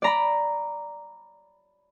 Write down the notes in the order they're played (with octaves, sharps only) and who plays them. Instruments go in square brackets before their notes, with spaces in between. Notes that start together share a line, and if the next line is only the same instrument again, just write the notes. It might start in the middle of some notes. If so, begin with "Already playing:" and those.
[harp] D5 A#5 B5